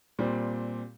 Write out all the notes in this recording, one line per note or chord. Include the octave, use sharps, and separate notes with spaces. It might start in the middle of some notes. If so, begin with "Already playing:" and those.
A#2 G3 C4